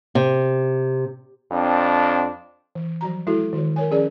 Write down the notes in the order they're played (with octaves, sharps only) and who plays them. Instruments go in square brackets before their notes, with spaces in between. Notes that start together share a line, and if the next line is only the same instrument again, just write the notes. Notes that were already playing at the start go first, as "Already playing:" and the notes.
[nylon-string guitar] C3
[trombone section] F2 C4 D4
[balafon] E3
F3 F#3 F#4 A#5
G#3 E4 F#4 A4
D#3 F#4 C#5
A#4 C#5 G#5
F3 C#4 G#4 D5